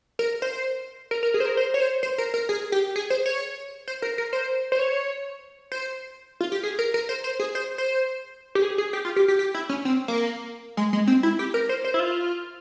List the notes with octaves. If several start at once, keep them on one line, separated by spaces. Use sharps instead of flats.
A#4
C5
A#4
A#4
G#4
C5
A#4
C5
C#5
C5
C5
A#4
A#4
G#4
G4
G#4
C5
C#5
C5
A#4
A#4
C5
C5
C#5
C5
F4
G4
G#4
A#4
A#4
C5
C5
G#4
C5
C5
G4
G#4
G#4
G4
F4
G4
G4
G4
E4
C#4
C4
A#3
G#3
G#3
C4
E4
G4
A#4
C5
C5
E4
F4